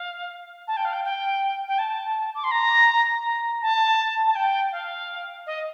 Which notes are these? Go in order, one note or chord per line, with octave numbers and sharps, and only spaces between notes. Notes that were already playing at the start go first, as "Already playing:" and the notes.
Already playing: F5
A5
G5
F5
G5
G5
G5
A5
D6
C6
A#5
A#5
A5
A5
G5
F5
D#5